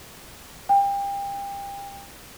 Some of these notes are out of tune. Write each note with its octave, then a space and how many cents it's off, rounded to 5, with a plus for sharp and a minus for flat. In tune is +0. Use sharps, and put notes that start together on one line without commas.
G5 +30